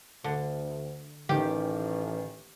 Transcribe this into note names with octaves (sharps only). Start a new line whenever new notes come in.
D2 D3
A1 D#3 G4